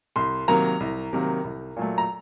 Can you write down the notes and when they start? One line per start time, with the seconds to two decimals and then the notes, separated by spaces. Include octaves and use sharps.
0.16 C2 C6
0.48 C3 D#3 F#3 A#3 A#5
0.80 C2
1.13 C3 D#3 F#3 A#3
1.44 C2
1.77 A#2 F#3 A3
1.98 A#5